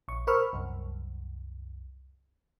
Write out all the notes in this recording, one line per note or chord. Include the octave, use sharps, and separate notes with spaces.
A#1 C#6
A#4 C5 B5 C#6 E6 F6
C2 F#2